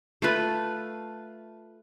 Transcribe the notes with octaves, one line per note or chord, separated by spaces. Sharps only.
A3 F4 B4